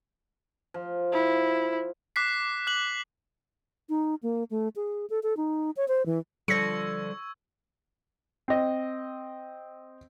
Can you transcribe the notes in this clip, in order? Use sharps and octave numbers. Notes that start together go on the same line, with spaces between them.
F3
E4
D6 F#6 B6 C7
F#6 F#7
D#4
A#3
A3
G#4
A4
A4
D#4
C#5
C5
E3
D3 F3 G3 C#6 E6 G#6 A#6 C#7
C4 D#5